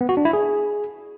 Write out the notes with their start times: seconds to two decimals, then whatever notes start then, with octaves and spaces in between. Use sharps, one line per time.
0.01 B3
0.09 F#4
0.17 D4
0.25 E4
0.33 G#4